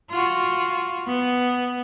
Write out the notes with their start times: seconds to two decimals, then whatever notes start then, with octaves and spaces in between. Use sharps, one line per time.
0.10 F4 F#4
1.08 B3